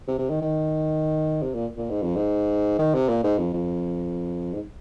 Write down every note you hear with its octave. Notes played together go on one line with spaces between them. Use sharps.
C3
C3
D#3
D#3
C3
A#2
A#2
G#2
F2
G#2
D#3
C3
A#2
G#2
F2
F2
G#2